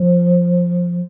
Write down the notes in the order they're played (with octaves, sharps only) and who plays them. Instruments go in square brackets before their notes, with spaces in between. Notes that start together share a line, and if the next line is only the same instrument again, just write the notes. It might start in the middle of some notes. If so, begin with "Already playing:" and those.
Already playing: [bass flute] F3